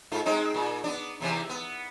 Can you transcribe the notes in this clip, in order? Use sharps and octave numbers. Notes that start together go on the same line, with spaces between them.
G#2 A3 F4
G#3 C4 D#4
A#2
B3 D4
E2 C3 E3
B3